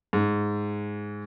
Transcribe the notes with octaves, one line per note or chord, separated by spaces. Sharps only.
G#2